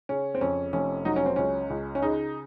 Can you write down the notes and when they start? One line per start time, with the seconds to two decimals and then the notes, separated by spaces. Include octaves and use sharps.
0.09 C#3 C#4
0.35 C4
0.41 F2 C#4
0.73 F1 C#4
1.05 F#3 D#4
1.16 C#4
1.26 C4
1.36 C#2 C#4
1.70 C#2
1.95 C#4
2.02 C#3 D#4